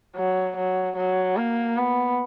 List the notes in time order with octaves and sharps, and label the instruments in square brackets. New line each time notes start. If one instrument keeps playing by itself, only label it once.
[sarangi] F#3
F#3
F#3
A#3
B3